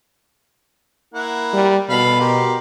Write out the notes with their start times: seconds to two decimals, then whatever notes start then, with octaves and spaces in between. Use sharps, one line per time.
1.14 A#3 E4 F#5
1.53 G3
1.89 B2 A4 F5 B5
2.20 G4 A#4 C6